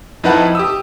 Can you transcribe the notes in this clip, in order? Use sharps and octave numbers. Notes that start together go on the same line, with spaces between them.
F2 D#4 E4 B4 F#5 A5
G4 D#6 E6